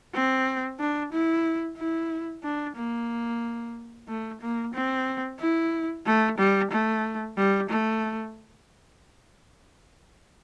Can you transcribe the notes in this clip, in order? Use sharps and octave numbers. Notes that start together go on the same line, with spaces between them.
C4
D4
E4
E4
D4
A#3
A3
A#3
C4
E4
A3
G3
A3
G3
A3